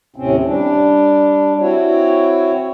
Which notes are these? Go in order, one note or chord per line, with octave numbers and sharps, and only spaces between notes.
D#2 A2 C3 C4 C#4
G3 D4
C4 E4 F#4 C#5